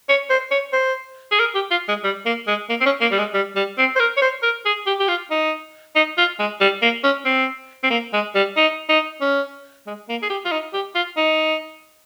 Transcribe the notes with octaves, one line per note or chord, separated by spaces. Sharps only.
C#5
C5
C#5
C5
G#4
A#4
G4
F4
G#3
G3
A#3
G#3
A#3
C4
C#4
A#3
G3
G#3
G3
G3
C4
C5
A#4
C#5
C5
A#4
G#4
G4
G4
F4
D#4
D#4
F4
G#3
G3
A#3
C#4
C4
C4
A#3
G#3
G3
D#4
D#4
C#4
G#3
A#3
G#4
G4
F4
D#4
G4
F4
D#4